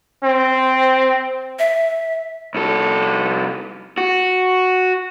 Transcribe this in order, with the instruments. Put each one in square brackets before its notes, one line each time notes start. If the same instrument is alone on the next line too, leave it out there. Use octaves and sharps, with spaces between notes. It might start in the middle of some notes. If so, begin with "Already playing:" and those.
[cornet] C4
[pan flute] E5
[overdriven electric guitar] C2 A4
F#4